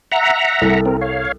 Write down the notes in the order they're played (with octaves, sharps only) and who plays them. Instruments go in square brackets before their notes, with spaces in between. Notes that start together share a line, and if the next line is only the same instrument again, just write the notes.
[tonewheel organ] E5 F#5 A#5
[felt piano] C2 A4
[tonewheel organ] C4 A#4
C#5 F5